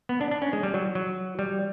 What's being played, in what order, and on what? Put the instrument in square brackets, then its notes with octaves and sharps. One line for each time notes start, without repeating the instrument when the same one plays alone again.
[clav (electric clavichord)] B3
D4
D4
C#4
G#3
G3
F#3
F#3
G3